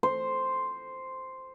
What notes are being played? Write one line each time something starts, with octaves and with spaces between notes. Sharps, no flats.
C5